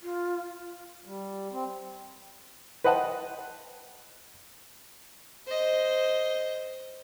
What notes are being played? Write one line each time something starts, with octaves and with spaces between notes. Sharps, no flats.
F4
G3
C4
B4 C5 D#5 F#5 G5 A5
C5 D#5